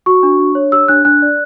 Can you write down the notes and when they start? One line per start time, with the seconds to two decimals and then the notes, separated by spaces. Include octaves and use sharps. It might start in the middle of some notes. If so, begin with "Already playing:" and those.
0.06 F#4 C#6
0.23 D4
0.39 D4
0.55 C#5
0.72 G4 E6
0.88 D4 F#6
1.05 D4 F#6
1.22 D5